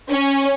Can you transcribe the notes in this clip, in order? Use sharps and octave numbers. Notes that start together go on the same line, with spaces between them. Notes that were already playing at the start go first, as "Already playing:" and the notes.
C#4